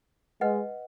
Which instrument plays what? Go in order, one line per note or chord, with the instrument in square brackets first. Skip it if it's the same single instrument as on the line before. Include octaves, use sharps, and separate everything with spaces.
[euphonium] G#3 [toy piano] B4 D#5 F#5